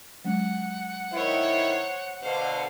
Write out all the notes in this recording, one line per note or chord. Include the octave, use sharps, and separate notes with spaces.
F#3 G#3 C#4 F#5
D#3 E4 C5 C#5
B2 D3 C5 F5